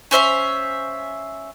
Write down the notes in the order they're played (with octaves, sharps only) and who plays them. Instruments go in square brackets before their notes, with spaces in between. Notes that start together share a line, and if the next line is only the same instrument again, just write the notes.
[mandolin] C#4 C5 E5 F5